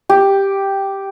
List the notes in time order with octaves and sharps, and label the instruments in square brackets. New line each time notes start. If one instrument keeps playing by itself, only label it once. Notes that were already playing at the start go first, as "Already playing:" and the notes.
[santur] G4